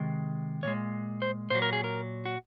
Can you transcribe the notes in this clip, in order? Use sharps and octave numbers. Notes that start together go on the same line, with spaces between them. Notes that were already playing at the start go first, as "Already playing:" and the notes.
Already playing: C3 D#3 G#3
A#2 G#3 C#5
C5
A#2 F#3 C5
A#4
G#4
A#4
F#4